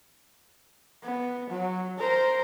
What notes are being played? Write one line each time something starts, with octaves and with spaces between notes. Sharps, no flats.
B3
F#3
A#4 C5